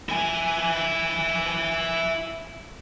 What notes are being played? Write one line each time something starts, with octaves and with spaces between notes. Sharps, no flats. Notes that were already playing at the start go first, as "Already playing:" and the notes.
E4 G#5